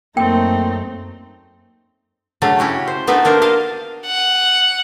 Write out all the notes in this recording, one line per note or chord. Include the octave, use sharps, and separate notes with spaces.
F#2 A3 A#3 C4 D#4 G5
C#3 F#3 A3 C#4 D4
C#4 E4 F#4 G4
C5
A3 B3 D4 D#4 A4 B4
A#3 D4 A#4 C5
D#5 F5 A5
F#5